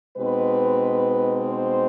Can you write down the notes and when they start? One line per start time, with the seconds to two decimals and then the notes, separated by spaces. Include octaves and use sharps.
0.17 B2 G#3 C4 D#4 B4
1.47 C5